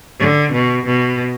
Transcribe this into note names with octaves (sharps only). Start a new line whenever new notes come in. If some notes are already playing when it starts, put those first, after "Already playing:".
D3
B2
B2